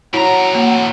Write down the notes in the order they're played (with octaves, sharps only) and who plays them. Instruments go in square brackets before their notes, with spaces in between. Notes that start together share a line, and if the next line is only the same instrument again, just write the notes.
[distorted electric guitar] A2 A#5 [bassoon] F#3 [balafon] E4 [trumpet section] F#5
[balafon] A#3